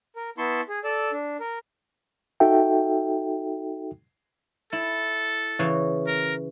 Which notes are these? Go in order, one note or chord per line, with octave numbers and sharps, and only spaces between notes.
A#4
B3 E4 A5 C6 C#6
G#4
A4 D5 E6
D4
A#4
D#4 F#4 A4 E5 G5
E4 A4
C#3 E3
A#4